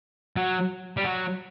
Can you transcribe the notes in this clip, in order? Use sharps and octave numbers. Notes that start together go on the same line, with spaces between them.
F#3
G3
F#3